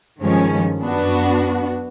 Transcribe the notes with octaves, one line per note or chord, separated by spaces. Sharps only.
G2 D#3 F3 G#3 C#4
F#2 B3 D4 F#4